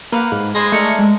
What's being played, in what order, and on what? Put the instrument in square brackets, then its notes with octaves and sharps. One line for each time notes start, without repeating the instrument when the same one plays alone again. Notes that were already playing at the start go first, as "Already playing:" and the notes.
[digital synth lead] A#3 [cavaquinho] B4 F5 F#5
[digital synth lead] G#2
[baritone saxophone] G#3 [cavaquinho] C5 B5 C6 [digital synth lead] A#6
[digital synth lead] A3 [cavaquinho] D#4 A#4 D5 [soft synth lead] C#7
[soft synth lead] G#3